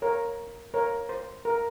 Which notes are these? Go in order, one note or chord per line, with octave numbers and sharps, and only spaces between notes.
A#4 C#5
A#4 C#5
C5
A#4